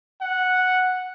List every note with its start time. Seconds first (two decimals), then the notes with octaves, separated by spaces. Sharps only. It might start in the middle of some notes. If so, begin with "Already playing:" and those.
0.21 F#5